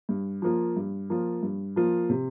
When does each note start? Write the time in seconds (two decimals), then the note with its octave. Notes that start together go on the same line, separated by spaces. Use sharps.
0.09 G2
0.42 F3 A#3 F4
0.76 G2
1.10 F3 A#3 F4
1.43 G2
1.76 F3 A#3 F4
2.09 C3